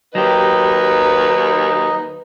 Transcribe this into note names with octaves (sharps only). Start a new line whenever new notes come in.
D#2 F#3 D#4 G4 B4 D#5